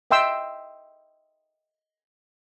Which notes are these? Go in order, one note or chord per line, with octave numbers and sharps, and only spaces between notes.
D#5 E5 G5 C6 E6